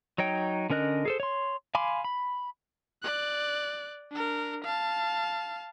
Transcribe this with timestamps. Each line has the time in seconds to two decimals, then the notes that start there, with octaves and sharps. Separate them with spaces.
0.18 F#3 D#4 C#5 G5
0.70 D3 C#4 A#4 D#5 F#6
1.05 G#4 A4 C5
1.20 C#5 C6
1.75 F5 G#5 B5 C6 D6
2.04 B5
3.03 D5 F#6
4.11 D4 A#4
4.64 F5 A5